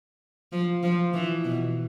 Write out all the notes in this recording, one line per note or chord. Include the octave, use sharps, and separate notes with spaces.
F3
F3
E3
B2